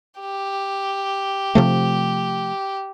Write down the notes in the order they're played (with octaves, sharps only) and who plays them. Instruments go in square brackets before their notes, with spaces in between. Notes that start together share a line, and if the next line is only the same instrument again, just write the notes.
[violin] G4
[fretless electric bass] C3 F3 A3